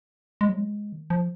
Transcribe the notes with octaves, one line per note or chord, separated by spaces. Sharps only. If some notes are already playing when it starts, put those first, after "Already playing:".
G#3
F#3
G#3
D#3
F3